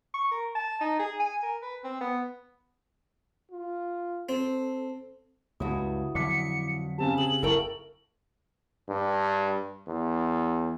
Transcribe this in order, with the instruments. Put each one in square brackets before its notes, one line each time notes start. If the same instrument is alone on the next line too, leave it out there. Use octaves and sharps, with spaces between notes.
[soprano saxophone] C#6
A#4
A5
D#4
G#4
G#5
A#4
B4
C4
B3
[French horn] F4
[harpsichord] C4 [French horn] A4
[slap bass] C#2 G2 [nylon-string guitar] E4 F#4 [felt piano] D#6
[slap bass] F2 D3 F#3 [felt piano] D6 B6 [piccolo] C#7
[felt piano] C#3 C4 G4 [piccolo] A5
[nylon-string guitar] G#4 [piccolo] F#7
[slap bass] F#1 [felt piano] E4 A5 C#6 [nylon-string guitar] A4 A#4 G5
[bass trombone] G2
E2